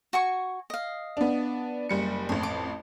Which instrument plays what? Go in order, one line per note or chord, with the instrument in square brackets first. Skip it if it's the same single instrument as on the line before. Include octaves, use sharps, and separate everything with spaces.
[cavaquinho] F#4 G#5 C#6
D#5 F5
[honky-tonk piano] B3 D4
F#1 G3 C#7
[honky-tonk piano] A1 F2 [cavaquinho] C#5
[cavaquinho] D6